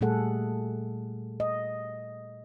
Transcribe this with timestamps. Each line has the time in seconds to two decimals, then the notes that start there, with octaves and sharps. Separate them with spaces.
0.01 A#2 G3 A3 G#4 A4 F#5
1.40 D#5